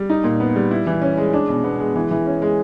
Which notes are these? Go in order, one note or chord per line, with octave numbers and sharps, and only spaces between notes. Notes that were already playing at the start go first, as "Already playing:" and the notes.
Already playing: G3
D#4
A#2
B3
G3
E4
E3
C#4
G#3
D4
B2
B3
G#3
E3
E3
C#4
G#3